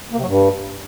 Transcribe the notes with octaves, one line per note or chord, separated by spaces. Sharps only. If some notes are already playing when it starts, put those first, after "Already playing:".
A#3
C3
F#3
G2